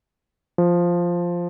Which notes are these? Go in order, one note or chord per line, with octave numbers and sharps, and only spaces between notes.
F3